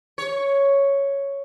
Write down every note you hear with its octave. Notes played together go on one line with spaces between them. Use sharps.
C#5